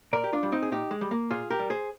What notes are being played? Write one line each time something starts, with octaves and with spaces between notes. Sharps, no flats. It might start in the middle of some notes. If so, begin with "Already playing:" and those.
A#2 A#4 D5
G4
D4 F4
G3
C4 D#4
G#4
A#2 D#4 G4
G#3
G3
A#3
A#2 F4 G#4
G4 A#4
G3
G#4 C5